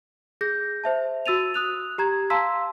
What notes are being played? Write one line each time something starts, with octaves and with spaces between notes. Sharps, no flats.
G#4 G6 A#6
C5 E5 A5
F#4 E6 A6 D#7 F7
D#6 F#6 F7
G4 A#5 G#6
F5 A5 A#5 C6 E6 B6